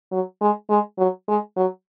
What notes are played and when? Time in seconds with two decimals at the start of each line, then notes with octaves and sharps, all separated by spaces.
0.12 F#3
0.41 G#3
0.70 G#3
0.98 F#3
1.28 G#3
1.56 F#3